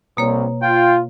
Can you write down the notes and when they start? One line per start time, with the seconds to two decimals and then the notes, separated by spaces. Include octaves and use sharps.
0.17 C2 B2 A#3 C#5
0.62 F4 G5